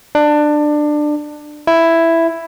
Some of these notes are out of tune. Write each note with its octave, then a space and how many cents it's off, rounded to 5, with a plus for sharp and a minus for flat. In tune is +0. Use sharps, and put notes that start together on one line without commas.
D4 +20
E4 +5